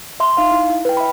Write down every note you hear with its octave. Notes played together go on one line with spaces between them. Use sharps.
E5 C6
D#4 F5
E4
E4
B4 G5
E5 B5